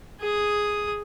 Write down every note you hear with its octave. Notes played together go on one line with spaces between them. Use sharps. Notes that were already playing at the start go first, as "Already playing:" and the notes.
G#4 D#6